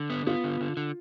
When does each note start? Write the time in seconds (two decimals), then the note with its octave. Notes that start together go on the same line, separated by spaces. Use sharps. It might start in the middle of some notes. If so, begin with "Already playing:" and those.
Already playing: D3
0.10 B3
0.27 B3 F4
0.44 D3
0.61 D3
0.77 D3